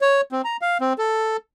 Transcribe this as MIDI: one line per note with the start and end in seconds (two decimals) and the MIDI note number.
0.01 0.21 73
0.32 0.42 60
0.44 0.57 82
0.62 0.78 77
0.81 0.93 60
0.98 1.37 69